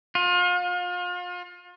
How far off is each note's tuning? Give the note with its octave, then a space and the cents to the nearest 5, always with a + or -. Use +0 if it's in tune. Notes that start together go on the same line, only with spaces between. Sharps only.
F4 +35